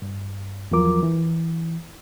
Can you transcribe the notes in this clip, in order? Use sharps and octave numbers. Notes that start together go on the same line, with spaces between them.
G2
E2 F3 F#3 F4 A#4 D6
E3